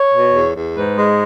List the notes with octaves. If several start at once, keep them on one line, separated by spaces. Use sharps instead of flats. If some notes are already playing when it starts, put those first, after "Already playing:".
Already playing: C#5
B2
E2
E2
G#2 B4
G#3